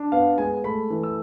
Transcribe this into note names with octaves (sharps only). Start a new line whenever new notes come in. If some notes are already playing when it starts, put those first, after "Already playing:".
Already playing: D4
B3 F5
G#3 G#5
A3 B5
E3
E6